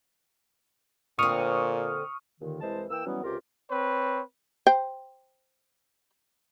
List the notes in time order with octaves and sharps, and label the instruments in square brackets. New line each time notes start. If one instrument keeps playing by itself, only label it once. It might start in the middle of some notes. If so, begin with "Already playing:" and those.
[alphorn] A#2 [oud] D3 C4 [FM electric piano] C#6 D#6 F6
[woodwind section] D#2 A#2 D3 D#3
C2 E3 G#3 C5 D#5 A5
E3 A#3 G5 E6
E3 F#3 G3 B3 C#4
C#2 C3 F4 G4 A#4
[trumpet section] C4 B4 C#5
[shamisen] C5 G5